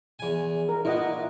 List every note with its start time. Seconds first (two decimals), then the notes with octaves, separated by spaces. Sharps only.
0.19 E2 G#5
0.69 A#4
0.85 A#2 E4 D#5 F#5